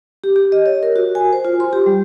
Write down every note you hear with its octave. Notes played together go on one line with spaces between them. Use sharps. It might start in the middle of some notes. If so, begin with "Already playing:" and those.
G4
G4
D#5
C#5
A#4
F#4
G#5
C5
F4
C6
G4
G3